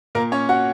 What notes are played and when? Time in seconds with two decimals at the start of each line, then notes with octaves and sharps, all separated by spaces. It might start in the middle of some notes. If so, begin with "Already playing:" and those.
0.15 A#2 A#3 A#4
0.32 C#4 C#5
0.49 F#4 F#5